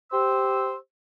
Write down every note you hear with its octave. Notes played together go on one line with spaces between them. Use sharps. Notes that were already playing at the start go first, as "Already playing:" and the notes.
G4 C5 E6